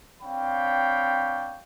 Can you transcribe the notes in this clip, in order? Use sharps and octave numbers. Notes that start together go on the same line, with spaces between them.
C4 D4 C#5 F5 G5 B5